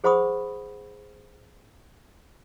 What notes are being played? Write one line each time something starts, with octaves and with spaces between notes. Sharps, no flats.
G#4 C5 F#5 B5 C#6 D#6